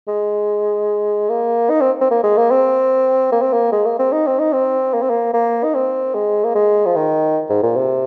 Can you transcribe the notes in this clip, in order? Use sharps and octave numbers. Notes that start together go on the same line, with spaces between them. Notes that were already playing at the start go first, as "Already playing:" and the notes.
G#3
A#3
D#4
C4
C4
A#3
G#3
A#3
C4
A#3
C4
A#3
G#3
A#3
C4
D#4
C4
D#4
C4
A#3
C4
A#3
A#3
D#4
C4
G#3
A#3
G#3
F3
D#3
G#2
A#2
C3